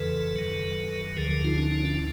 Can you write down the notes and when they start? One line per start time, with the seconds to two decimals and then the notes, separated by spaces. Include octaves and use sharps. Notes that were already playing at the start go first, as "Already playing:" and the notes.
Already playing: F2 C#3 E3 A4 B4
0.36 F#2 D#3 F#3
1.17 D2 D3 F3 G#4 A#4
1.31 G#4 A#4
1.44 D#4 F4
1.58 C#4 D#4
1.71 C#4 D#4
1.85 D4 E4